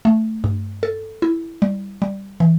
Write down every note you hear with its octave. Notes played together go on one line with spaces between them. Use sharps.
A3
G2
A4
E4
G3
G3
E3